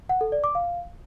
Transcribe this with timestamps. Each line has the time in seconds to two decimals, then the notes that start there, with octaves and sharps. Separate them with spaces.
0.09 F#5
0.21 A4
0.32 D5
0.44 D6
0.55 F5